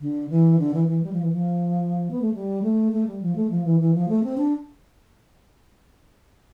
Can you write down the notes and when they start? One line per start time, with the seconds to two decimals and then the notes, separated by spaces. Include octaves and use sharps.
0.01 D3
0.30 E3
0.59 D3
0.74 E3
0.88 E3
1.03 G3
1.13 F3
1.22 E3
1.33 F3
2.11 B3
2.22 A3
2.34 G3
2.63 A3
2.93 A3
3.07 G3
3.22 F3
3.36 A3
3.50 F3
3.65 E3
3.80 E3
3.94 F3
4.09 A3
4.23 C4
4.38 D4